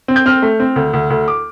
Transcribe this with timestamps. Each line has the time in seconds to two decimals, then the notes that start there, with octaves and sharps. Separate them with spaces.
0.08 C4
0.16 G6
0.26 C4 F6
0.42 A3
0.60 C4
0.76 D2
0.93 D2
1.10 D2
1.28 D6